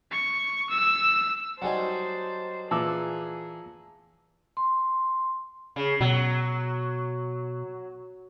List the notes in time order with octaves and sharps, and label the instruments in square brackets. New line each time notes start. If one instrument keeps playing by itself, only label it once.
[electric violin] C#6
E6
[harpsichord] F#3 G3 D#4 [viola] C5 A5 [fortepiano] F#5 G#5
[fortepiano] A#2 D6 [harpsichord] E3 [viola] G#4 [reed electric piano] A5 E6
[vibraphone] C6
[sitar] C#3
[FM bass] B2 [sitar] F#3